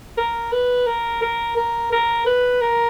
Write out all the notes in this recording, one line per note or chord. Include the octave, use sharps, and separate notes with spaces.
A#4
B4
A#4
A#4
A#4
A#4
B4
A#4